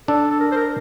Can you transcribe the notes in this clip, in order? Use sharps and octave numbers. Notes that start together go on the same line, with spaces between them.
D4 A4
A4
A#4
C5
A#4